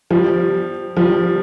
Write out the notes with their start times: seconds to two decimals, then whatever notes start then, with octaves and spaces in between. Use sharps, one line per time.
0.11 F3 G3
0.97 F3 G3